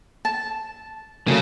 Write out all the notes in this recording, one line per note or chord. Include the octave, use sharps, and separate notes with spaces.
A5
C#3 F#3 A3 A#3